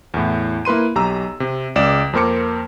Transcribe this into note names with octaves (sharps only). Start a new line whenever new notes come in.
E2 A2
A#3 E4 B4 C6 D#7
B1 G4 A#5 E6
C3
C#2 D5 E7
F2 A#3 A#4 C5 D6 C#7